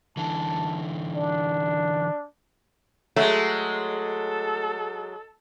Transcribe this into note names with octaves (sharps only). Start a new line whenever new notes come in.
D3 E3 A5
D4
F#3 G#3 A3
A4